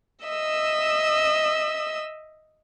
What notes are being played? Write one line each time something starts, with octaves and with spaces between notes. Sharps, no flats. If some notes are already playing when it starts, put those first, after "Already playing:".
D#5 E5 E6